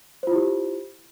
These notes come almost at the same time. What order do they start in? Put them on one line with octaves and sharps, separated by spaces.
C5 F4 E4 G4